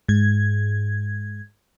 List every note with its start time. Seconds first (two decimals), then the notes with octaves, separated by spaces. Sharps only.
0.08 G#2 G#6